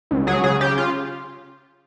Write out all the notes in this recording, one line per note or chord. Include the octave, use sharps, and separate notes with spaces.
C#2
F#3 G#4
C#3 G#4
C#3 G4
F4